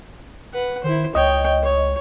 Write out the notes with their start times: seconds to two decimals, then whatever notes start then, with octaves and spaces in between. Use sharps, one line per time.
0.54 B4 F#5
0.84 D#3 E4 C5
1.15 C#2 C#5 D#5 G5
1.63 C#5